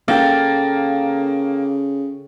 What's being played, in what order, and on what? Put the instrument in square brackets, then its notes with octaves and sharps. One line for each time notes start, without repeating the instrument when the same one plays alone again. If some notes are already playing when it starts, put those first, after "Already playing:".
[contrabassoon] C#3 [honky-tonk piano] A#3 [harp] A4 G5